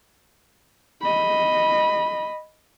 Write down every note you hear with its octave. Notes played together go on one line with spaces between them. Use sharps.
D#5 B5